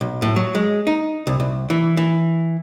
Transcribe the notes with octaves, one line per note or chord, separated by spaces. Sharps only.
B1
A2
F#3
G#3
D#4
C2
C2
E3
E3